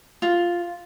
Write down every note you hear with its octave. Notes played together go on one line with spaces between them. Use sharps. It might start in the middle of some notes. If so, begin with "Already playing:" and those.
F4